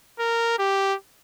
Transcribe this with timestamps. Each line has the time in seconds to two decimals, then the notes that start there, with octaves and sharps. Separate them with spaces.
0.19 A#4
0.58 G4